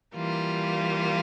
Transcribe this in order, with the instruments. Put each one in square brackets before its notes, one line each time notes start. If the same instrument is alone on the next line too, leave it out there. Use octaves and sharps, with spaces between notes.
[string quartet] E3 G3 A#3 F4